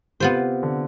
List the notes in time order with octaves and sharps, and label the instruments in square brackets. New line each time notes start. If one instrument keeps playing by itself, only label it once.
[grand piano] C3 [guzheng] B3 F4 C5
[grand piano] D3